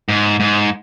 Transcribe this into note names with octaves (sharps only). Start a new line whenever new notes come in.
G#2
G#2